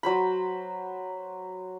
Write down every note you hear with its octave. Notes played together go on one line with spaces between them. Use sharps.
F#3 C5 B5